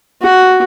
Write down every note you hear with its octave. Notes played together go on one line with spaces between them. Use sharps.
F#4